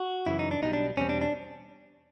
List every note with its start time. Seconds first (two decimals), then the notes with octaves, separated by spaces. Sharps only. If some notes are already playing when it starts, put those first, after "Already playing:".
Already playing: F#4
0.27 F#2 C#3 E3 E4
0.39 D#4
0.51 D4
0.62 B1 B2 G3 D#4
0.73 D4
0.97 E2 B2 G3 C4 C#4
1.09 D4
1.21 D4